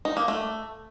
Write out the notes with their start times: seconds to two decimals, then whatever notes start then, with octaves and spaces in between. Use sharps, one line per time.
0.05 D#4
0.17 A#3
0.28 A3